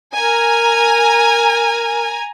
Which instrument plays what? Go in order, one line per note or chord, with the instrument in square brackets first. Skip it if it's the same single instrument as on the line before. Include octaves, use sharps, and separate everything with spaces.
[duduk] A#4 [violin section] G#5 A#5